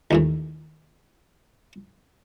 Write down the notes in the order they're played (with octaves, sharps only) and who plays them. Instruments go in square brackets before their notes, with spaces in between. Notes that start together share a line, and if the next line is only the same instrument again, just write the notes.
[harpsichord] D#2 A2 E3